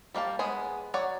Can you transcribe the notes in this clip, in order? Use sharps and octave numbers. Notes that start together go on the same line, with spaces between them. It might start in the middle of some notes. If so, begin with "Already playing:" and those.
G3 A#3 F5 A5
G#3 B3 G#4 G#5
F#3 C#5 D5 F#5